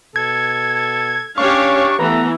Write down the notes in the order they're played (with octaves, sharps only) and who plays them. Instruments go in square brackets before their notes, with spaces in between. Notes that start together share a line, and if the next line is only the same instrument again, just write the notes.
[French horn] B2 [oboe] A4 [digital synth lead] G#6
[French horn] C#4 [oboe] D4 [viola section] G4 C#5 F5 [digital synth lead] C#6
[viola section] E3 [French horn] A3 [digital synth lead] B3 [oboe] A#5